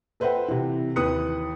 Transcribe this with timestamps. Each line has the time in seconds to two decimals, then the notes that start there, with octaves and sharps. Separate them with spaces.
0.20 A4 B4 C5 E5 F#5 G5
0.48 C3 E3
0.96 D#2 E3 B4 D#6 F#6 C#7